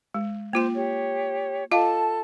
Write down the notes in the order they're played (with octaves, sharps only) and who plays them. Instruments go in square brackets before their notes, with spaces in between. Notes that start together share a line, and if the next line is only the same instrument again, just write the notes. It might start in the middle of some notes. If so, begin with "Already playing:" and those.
[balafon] G#3
[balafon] A#3 F4 G5 [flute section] C5
[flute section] G4 C#5
[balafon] F4 D#5 F5 [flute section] A4 A5